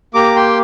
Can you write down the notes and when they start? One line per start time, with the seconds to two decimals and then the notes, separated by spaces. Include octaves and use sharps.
0.14 A#3 G4 A#5 D6
0.36 G5 C6